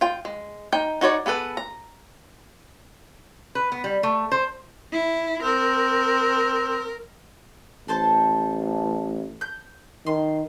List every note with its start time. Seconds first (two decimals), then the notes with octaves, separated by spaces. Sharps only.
0.01 F4 G5
0.25 G#3
0.73 D#4 G5
1.01 D#4 F#4 C#5 D5
1.26 B3 G#4 A4 B4
1.57 A#5
3.55 B4
3.72 B3
3.84 G3
4.03 A3
4.32 C5
4.92 E4
5.43 C4 A#4
7.88 A1 A4 C5 A5
9.41 G6
10.06 D#3 C6